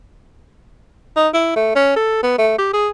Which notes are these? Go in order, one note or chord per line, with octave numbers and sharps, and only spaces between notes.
D#4
E4
A3
C#4
A4
B3
A3
G4
G#4